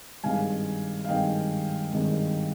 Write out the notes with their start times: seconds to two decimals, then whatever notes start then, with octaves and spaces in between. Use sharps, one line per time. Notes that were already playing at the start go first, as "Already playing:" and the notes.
0.24 G#1 G2 D#3 G#3 F5 G#5
1.04 F5
1.08 G#1 G2 D#3 G#3 D#5 G5
1.93 G#1 G2 D#3 G#3